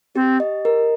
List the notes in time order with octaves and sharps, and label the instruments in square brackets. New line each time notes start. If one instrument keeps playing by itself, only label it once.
[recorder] C4 [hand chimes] G4
[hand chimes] D#5
A#4